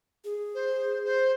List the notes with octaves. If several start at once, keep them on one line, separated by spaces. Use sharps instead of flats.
G#4
C5
C5